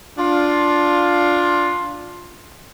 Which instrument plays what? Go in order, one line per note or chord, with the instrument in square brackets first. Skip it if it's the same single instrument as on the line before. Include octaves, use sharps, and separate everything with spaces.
[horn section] D4 F4